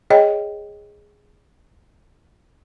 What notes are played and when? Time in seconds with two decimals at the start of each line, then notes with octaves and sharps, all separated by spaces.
0.10 G#4 C#5 D#5 G5